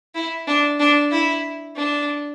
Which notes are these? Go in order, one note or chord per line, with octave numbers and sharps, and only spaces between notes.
E4
D4
D4
E4
D4